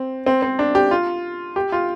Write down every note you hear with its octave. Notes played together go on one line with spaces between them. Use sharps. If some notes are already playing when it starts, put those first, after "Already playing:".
Already playing: C4
C4
C4
D4
G4
F4
G4
F4